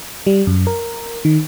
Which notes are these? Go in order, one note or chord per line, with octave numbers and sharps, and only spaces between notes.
G3
F#2
A#4
D#3